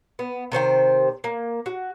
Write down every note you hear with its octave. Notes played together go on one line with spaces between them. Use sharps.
B3
C3 D#3 C5 G5
A#3
F#4